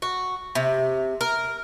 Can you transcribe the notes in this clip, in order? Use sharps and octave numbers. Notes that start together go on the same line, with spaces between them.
F#4
C3
A#4